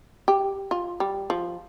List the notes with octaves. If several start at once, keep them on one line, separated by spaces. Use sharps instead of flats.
G4
F4
G3
F3